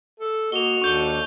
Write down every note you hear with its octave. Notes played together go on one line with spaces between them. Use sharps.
A4
A#3 F#4 D#5 F7 G7
D#2 D4 A4 C#6 G6 G7